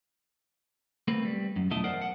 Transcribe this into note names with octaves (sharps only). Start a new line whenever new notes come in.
A3 A#3 C4 B4
G3
F#2
E2 B2 A3 E4 D#5 A5
A#4 C5 D5 F#5
F#5